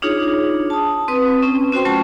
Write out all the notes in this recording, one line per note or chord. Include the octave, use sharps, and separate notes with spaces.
D4 D#4 F4 G#4 C#5
A5 D#6
C4 B4 D#6
C#4
C#4 F#4 C5 G5 C6
F#3 A3 F4 A5 C#6